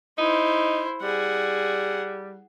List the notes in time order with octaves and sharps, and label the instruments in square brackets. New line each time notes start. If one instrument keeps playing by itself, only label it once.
[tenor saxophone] D#4 [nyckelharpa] E4 C5
[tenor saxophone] G3 [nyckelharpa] G#4 F#5